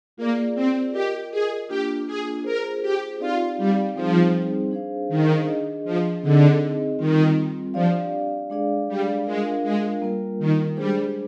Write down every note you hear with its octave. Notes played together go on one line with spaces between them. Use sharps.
A#3 F4 G#4 D5
C4
F4 G4 A#4 D#5
G#4
A#3 D4 F4 G4
G#4
F4 G#4 A#4 C5
G4
C4 D#4 F4 G4 D5 F5
G3
F3 G3 C4 D#4 G#4 C5
D4 G#4 C5 F5
D#3
D4 G#4 D#5
F3
D3 C4 D#4 G#4 D#5
D#3 G3 C4 F4
F3 D4 G4 D5 F5
G#3 D4 G#4 D5 F5
G3
G#3 D4 F4 A#4 F5
G#3
G3 A#3 F4 A#4
D#3
G3 G#3 D4 G#4 C5